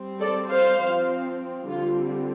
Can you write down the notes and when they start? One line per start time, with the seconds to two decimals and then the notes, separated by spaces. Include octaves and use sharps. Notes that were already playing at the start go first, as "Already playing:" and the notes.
Already playing: G3 C4
0.20 A4 D5
0.49 C5 F5
0.80 F3 C4
1.69 D3 G3 C4 F4